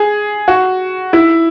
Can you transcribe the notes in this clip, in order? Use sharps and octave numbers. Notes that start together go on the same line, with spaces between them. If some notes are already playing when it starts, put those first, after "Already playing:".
Already playing: G#4
F#4
E4